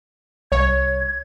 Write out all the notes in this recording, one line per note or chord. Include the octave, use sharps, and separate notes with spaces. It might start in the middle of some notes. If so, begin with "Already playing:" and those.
C2 C#5 G#6